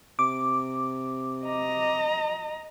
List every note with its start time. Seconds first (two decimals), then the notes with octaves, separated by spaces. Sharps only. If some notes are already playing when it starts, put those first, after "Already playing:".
0.19 C3 D6
1.45 D#5 A#5